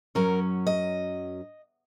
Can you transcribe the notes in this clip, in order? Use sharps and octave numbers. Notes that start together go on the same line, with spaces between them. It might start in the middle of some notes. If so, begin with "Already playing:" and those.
F#2 F#3 C#4 A#4
D#5